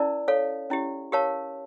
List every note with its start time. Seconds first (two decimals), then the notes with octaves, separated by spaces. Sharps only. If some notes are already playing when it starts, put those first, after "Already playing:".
Already playing: C#4 E4 A#4 D5 A5
0.28 A4 C#5 F5
0.70 C#4 E4 G4
1.12 G4 A#4 C#5 F5 A5